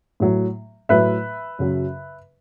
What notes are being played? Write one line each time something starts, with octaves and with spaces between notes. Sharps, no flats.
A2 F#3
A2 F#3 B4 E5
F#2 C#3 F#3